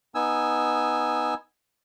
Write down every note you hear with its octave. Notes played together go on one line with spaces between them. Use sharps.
B3 D#4 G#5 E6